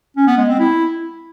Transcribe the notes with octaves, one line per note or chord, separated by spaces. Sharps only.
C#4
B3
G#3
C4
E4